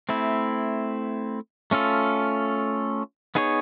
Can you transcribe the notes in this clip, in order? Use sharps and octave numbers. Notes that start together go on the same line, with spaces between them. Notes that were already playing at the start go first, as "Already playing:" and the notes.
A3 C4 E4
A3 C#4 F4 A4
B3 D#4 G#4 C#5